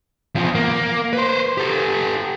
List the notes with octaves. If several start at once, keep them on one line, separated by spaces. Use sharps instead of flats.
E2 F3
A#3
B4 C5
G4 A4